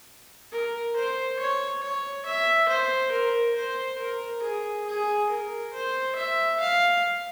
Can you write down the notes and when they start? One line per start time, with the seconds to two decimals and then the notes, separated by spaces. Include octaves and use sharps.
0.52 A#4
0.96 C5
1.40 C#5
1.83 C#5
2.26 E5
2.69 C5
3.12 A#4
3.56 C5
3.99 A#4
4.42 G#4
4.87 G#4
5.30 A#4
5.73 C5
6.16 E5
6.60 F5